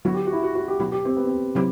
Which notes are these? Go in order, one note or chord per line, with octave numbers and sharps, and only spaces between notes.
D3 F#3 B3 E4 F#4
G4
F#4
E4
F#4
F#4
G4
B2 F#3 B3 E4
G4
C4
B3
C4
C3 F#3 C4 E4 G4